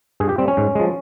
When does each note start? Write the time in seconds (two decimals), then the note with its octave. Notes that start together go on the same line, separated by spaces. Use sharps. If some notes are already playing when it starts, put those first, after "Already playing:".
0.20 G2 G#4
0.29 G4
0.38 G3 C4
0.48 C#4
0.57 G#2
0.75 F3 G#3